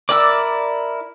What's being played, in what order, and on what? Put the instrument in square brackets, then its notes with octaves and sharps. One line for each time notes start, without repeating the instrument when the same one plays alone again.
[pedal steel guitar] E4 A#4 D6 [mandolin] D5 E6